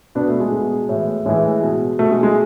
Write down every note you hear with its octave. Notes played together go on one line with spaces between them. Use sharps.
B2 B3 D4
A3
G#3
B2
A2 E3
A2 E3 G#3
B2
B2 A3
G#3
G#3